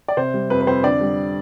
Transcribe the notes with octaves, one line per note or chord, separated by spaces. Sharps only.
D5
C3 C5
G3
F2 B4
B4
F2 C5
D3 D5
G3